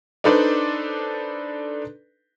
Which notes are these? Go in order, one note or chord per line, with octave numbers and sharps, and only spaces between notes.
D4 D#4 A4 B4 C5 D5